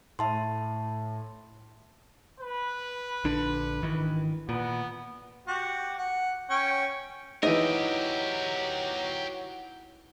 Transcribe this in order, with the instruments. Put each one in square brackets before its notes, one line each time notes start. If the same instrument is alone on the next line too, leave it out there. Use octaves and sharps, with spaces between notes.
[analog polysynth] A2 [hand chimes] E5 A5 C6
[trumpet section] B4
[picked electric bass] A#1 D3 D4
G#1 D#3 E3
[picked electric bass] A#2 [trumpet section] B3
[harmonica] F#4 G4
F#5
C#4 G5 C#6
[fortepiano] E3 D#4 [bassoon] F#3 [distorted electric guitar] G4 A#4 [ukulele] D#5